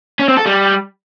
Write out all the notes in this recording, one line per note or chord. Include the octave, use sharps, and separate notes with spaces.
C#4
C4
A4
G3